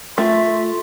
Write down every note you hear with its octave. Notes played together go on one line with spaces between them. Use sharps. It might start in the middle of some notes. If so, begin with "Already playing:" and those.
A3 F4 E5